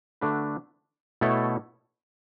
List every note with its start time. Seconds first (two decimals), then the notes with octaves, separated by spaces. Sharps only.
0.21 D3 A3 D4 F#4 B4
1.21 B2 A3 E4 A4 C#5